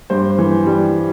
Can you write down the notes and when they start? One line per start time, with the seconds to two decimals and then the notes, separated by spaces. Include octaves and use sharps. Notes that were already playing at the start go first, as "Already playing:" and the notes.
0.10 G2 C5
0.38 E3
0.66 G3